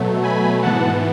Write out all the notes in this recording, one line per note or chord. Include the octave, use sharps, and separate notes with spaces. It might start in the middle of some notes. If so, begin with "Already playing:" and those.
Already playing: B2 F#3 A3
G#5 B5
G#2 E3 B3 F#5 A5